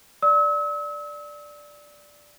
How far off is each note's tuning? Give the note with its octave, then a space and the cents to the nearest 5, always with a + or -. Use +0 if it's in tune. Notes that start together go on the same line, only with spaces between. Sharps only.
D5 +0 E6 -40